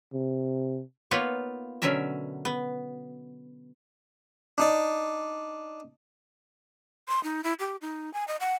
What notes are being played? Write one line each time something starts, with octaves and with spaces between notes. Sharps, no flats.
C3
A#3 B3 D#4 F4 B4 C#5
B2 D3 F#3 C#4 A#4 E5
B3
D4 D#4 D5
C6
D#4
E4
G4
D#4
G#5
D#5
F#5